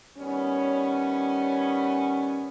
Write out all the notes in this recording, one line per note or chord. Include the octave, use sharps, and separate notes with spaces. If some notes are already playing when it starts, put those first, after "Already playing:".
D#3 G3 B3 C#4